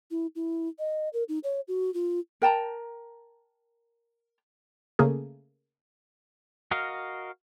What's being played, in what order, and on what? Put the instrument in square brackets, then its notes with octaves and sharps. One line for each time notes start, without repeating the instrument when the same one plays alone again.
[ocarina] E4
E4
D#5
A#4
D#4
C#5
F#4
F4
[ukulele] A#4 G5 A5 A#5
[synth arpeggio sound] C#3 A3 A#3 G#4
[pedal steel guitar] F#4 A#4 D#5 F5